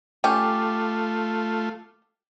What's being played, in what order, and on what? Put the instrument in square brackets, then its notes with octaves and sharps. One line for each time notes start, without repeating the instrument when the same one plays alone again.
[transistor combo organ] A3 F4 [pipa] C#4 G4